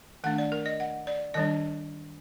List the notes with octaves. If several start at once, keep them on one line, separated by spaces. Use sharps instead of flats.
D#3 A3 D4 F#5
D5
A#4
D#5
F#5
D5
D#3 G3 D4 D#5